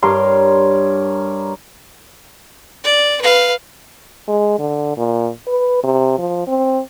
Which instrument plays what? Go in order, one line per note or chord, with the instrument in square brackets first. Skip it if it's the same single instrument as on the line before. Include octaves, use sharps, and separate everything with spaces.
[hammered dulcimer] G2 A#4 C#5 C6
[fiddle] D5
B4 F5
[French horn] G#3
D3
A#2
B4
C3
F3
C4